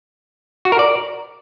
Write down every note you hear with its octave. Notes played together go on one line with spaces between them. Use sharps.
F#4
A#4
D5